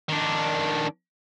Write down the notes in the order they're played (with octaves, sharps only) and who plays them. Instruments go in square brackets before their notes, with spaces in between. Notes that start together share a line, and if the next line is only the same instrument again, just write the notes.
[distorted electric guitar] D#3 D4